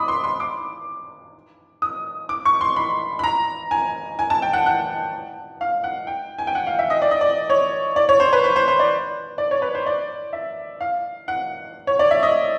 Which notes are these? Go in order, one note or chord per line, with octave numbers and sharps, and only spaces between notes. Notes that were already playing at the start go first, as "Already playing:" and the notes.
Already playing: B5 D6 D#6
C6
C6
D6
D#6
D6
C#6
C6
B5
B5
A#5
G#5
G#5
A5
G5
F#5
F#5
F5
F#5
G5
G#5
G5
F#5
F5
E5
D#5
D5
D#5
D5
C#5
D5
C#5
C5
B4
C5
C5
C5
D5
D5
C#5
B4
C5
D5
E5
F5
F#5
C#5
D5
E5
D#5